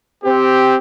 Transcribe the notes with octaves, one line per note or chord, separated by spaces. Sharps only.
C4 G4